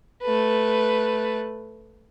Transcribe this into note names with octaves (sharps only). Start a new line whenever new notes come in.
A3 B4